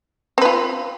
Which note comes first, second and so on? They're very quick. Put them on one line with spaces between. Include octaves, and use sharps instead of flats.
C4 B4 F4